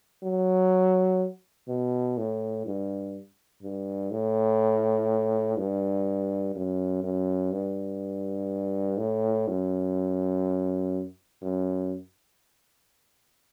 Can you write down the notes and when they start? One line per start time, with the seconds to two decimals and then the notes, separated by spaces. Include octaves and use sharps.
0.23 F#3
1.68 B2
2.18 A2
2.66 G2
3.63 G2
4.11 A2
5.58 G2
6.55 F#2
7.03 F#2
7.52 G2
8.98 A2
9.48 F#2
11.42 F#2